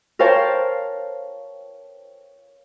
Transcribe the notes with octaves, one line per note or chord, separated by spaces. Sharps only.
A#4 C5 C#5 F5 G5 A5